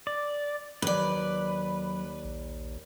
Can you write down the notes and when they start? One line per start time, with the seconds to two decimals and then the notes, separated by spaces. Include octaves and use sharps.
0.07 D5
0.82 D#2 F#3 B4 D5
2.25 A#1